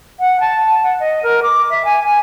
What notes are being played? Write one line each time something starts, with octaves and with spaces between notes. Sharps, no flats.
F#5
A5
F#5
D#5
A#4
D6
E5
G#5
G#5